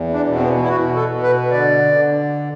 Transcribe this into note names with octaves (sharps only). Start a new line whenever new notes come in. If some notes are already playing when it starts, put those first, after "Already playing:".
Already playing: E2
D4
B2
C4
B3
E4
B2 F#4
A4
B2
B4
D3 D5
D3